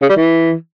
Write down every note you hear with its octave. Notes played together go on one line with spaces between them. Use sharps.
C#3
G3
E3